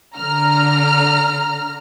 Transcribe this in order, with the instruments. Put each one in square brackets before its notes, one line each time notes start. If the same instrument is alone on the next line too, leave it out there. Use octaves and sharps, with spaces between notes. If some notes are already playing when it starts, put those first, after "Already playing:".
[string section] D3 A#5 F6